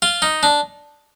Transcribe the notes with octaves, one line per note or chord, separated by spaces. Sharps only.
F4
D#4
D4